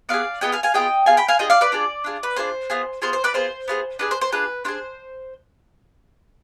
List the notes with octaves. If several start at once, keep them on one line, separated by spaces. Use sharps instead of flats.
B3 F4 D5 F5
G#4
B3 F4 G#4 D#5 G5
F5 G#5
F5 G#5
B3 F4 G#4 D#5 G5
B3 F4 G#4 F5 G#5
G5 B5
F5 G#5
D4 F4 G#4 D#5 G5
D5 F5
B4 D5
D4 F4 G#4
D4 F4 G#4
B4
D4 F4 G#4 C5
B3 F4 G#4
B3 F4 G#4 C5
C5
B4 D5
B3 F4 G#4 C5
B3 F4 G#4
D4 F4 G#4 B4
C5
C5
D4 F4 G#4 B4
D4 F4 G#4 C5